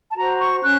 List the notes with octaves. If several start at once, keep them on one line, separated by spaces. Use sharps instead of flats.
A5
F#4 C5 A#5
C#6
C#4 F#6